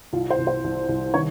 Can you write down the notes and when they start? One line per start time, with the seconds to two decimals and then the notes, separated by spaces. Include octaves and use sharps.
0.13 C2 F4
0.30 C5
0.38 C2
0.47 C5
0.64 C2
0.89 C2
1.14 D#3 C#5